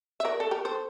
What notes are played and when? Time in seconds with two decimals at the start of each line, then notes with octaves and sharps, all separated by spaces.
0.20 E5
0.25 A#4 D5
0.40 A4
0.51 G4 A#4
0.65 A4 C5